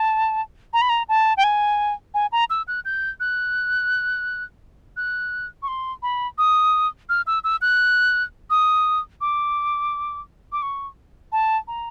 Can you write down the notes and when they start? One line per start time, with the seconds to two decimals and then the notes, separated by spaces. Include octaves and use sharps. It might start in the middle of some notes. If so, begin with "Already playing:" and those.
Already playing: A5
0.73 A#5
0.81 B5
0.89 A#5
1.09 A5
1.37 G5
1.44 G#5
2.14 G#5
2.32 A#5
2.50 E6
2.68 F#6
2.85 G6
3.20 F#6
4.97 F#6
5.62 C#6
5.68 C6
6.03 B5
6.38 D#6
7.09 F6
7.27 E6
7.44 E6
7.61 F#6
8.50 D#6
9.21 D6
10.52 D6
10.62 C#6
11.32 A5
11.68 A#5